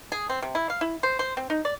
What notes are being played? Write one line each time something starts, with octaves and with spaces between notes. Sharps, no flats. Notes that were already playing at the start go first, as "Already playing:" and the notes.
G#4
C4
C3
E4
F5
E4
C5
C5
C4
D#4
D5